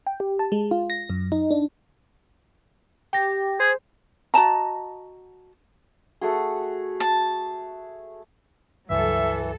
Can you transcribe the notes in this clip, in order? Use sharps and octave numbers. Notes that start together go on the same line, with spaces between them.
G5
G4
A5
G#3
F4
A#6
F#2
D#4
D4
G4 G5 A#6
G#4 C5
F#4 D#5 A5 A#5
A3 F#4 G#4
A5
C#2 G2 E3 F#3 A4 E5